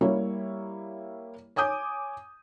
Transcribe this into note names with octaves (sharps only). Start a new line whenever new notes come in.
G3 A#3 E4 C#5
C#5 G#5 D6 D#6 G6